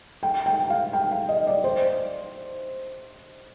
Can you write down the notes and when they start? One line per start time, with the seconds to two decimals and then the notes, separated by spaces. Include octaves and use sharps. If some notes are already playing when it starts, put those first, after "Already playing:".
0.23 G5
0.46 G5
0.70 F5
0.93 G5
1.11 F5
1.29 D#5
1.47 D5
1.64 C5